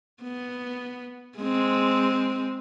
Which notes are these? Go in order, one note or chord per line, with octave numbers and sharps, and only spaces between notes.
B3
G#3 C4